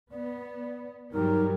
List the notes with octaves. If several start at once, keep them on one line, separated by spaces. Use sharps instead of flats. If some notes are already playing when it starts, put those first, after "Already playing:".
B3 D5
G2 F#3 G3 D#4 A#4